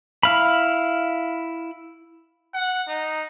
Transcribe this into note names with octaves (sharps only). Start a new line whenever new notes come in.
E4 F5 B5
F#5
D#4